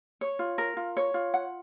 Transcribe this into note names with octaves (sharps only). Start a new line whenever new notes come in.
C#5
F4
A#4
F4
C#5
F4
F#5